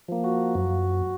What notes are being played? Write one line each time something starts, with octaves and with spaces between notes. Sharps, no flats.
F3 A#3
F#4
F#2